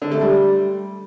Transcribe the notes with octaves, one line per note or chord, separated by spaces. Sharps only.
D3
A3
G3